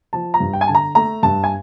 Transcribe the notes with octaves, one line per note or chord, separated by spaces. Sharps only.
F3 A5
A#5
G2
G5
G#5
D3 A5
A#5
A3 A#5
G2 A5
G#5